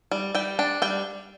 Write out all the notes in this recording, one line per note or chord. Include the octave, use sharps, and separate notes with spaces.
G3
G3 G5
D4 G5
G3 G5